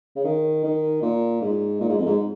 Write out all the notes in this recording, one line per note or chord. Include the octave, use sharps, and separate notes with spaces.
C#3
D#3
D#3
A#2
G#2
A#2
G#2
F2
G#2